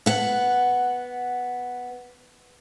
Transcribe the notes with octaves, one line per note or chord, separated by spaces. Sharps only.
B3 F#5